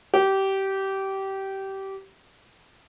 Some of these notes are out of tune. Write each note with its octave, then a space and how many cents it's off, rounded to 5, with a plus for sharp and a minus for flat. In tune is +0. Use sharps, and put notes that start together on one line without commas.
G4 -20